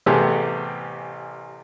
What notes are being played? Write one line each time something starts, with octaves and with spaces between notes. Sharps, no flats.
A1 C3 A3 B3 G4 G#4